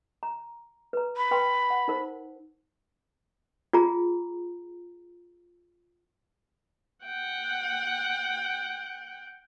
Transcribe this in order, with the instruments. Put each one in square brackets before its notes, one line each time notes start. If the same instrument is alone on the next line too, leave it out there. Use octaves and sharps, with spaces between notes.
[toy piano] A#5
B4 A#5
[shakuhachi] B5
[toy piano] B4 G5 C6
F#5
D#4 A#4 C5
F4 G#4 A#5
[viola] F#5 G5